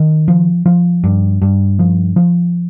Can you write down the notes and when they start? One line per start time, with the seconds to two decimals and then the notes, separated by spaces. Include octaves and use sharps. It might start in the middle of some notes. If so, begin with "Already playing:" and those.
Already playing: D#3
0.28 F3
0.66 F3
1.04 G2
1.42 G2
1.79 F3
2.16 F3